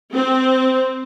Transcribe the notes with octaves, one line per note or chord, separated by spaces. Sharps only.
C4